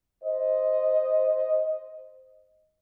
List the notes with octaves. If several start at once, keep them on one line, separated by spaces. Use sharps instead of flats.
C5 D#5